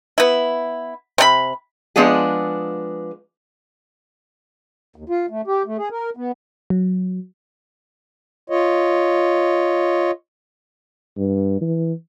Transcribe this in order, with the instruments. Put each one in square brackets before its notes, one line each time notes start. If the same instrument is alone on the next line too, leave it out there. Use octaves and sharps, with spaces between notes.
[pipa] B3 E4
C3 D#4 B5
[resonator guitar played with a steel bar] F3 G#3 B3 D4 F4 G#4
[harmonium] D#2
F4
A3
G4
A3
G#4
A#4
B3
[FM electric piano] F#3
[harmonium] F4 C#5 D#5
[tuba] G2
E3